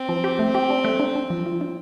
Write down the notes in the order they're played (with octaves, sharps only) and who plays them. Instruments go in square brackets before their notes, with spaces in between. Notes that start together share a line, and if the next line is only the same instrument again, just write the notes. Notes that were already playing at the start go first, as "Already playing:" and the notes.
Already playing: [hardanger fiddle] C4
[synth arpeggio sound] F3
G4
A3
G4
D4
A3
D4
D4
F3
F3
D4